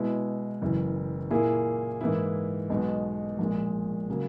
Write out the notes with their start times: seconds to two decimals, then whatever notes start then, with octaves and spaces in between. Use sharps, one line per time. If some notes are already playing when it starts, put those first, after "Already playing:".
Already playing: B2 G#3 B3 E4
0.62 F#1 F#2 E3
1.31 A#2 A#3 E4 G#4
2.01 G#2 E3 A#3 E4
2.70 B1 B2 G#3 B3
3.39 A#1 A#2 G#3
4.10 C#3 F#3 A#3